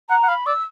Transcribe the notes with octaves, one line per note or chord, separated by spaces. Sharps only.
F#5 A#5
F#5
F5 B5
D5 E6